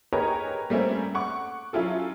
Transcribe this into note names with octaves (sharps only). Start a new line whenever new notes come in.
G4 G#4 A#4 B4 C#5 D#5
G3 A3 A#3 C4 C#4
F#5 C#6 D6
F#3 C#4 E4 F4 A4